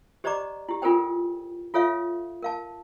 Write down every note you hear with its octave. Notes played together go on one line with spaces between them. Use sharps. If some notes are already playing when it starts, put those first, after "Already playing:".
G4 C5 D5 D#5 A#5 D6
E4 G4
D4 F4 A4 A#4 C5 G5
F4 A4 C#5 E5 F5
A#4 F5 A5